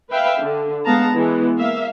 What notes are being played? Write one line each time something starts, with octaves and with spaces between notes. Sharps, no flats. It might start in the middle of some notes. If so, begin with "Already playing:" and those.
B4 E5 F5 G5
D3
G#3 B3 F5 A5 A#5
E3 G#3 B3
A#3 E5 F5